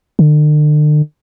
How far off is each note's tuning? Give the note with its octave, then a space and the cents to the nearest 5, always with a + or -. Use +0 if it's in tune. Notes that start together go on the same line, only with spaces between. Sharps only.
D3 +40